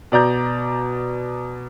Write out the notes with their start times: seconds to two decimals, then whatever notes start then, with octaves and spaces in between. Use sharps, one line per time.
0.12 B2 D5 A#5 G6